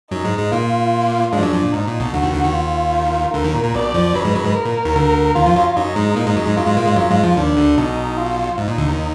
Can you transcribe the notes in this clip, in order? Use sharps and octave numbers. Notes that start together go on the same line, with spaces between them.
F#2 F#3 D#4
G#2 G#3
G#2 G#3
A#2 A#3 F4
G#2 G#3 D4
F3
F#2 F#3
F2 F3
A#2
G#2 D#4
A#2
B1 B2
D2 D3 F#4
D#2 D#3
D2 D3
D#2 D#3
F4
D2 D3 A#4
D#2 D#3
A#2
A#2
B1 B2 D5
F2 F3
F#2 F#3 B4
G#2 G#3
F#2 F#3
G#2 G#3
A#4
A#2
D#2 D#3
D2 D3
D#2 D#3 F4
F2 F3
F#2 F#3
F#2 F#3 D#4
G#2 G#3
A#2 A#3
G#2 G#3
F#2 F#3
G#2 G#3
F#2 F#3 F4
G#2 G#3
A#2 A#3
G#2 G#3
F#2 F#3
G#2 G#3
F2 F3
D#2 D#3 D4
D2 D3
B1 B2 D#4
F4
G#2 D#4
A#2
D2 D3
D#2 D#3